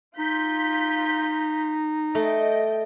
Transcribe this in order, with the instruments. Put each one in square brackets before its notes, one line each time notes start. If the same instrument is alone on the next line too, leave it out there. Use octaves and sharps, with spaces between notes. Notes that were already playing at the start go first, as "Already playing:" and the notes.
[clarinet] D#4 [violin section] F4 G6 B6
[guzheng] A3 [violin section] D#5 G5